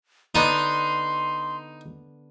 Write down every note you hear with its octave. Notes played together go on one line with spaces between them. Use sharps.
D3 B3 D4 D#4 C6